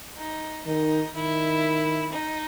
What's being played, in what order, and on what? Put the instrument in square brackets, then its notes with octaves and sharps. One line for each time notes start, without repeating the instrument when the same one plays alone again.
[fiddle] D#4
[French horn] D#3 [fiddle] D#4
[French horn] D#3 [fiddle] E4
[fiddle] D#4